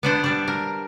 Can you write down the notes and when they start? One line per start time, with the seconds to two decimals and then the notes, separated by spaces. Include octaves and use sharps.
0.03 B3 D4 C5
0.24 G3 D4
0.48 A#4